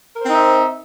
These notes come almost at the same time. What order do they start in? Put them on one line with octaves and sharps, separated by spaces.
A#4 C5 C4 D#4 E5